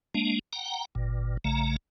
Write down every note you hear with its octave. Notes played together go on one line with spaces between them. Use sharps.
G#3 A#3 D4
F#5 G5 A#5
G1 A#2
A#1 C#3 A3 A#5